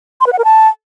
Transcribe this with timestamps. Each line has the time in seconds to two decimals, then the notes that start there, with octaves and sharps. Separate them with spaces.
0.21 C6
0.27 B4
0.32 F#5
0.38 A#4
0.44 A5